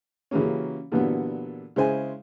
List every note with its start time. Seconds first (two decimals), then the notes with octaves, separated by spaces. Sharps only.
0.31 C#3 E3 F#3 G3 A#3 C#4
0.92 A#2 D3 E3 F#3 G3 B3
1.76 C#3 G#3 E4 C5 G#5